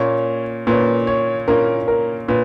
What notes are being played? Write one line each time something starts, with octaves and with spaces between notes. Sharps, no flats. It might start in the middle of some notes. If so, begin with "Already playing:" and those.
Already playing: A#2 A#3 C#4 C#5
A#2 A#3 C#4 B4
C#5
A#2 A#3 C#4 A#4
A#4
A#2 B4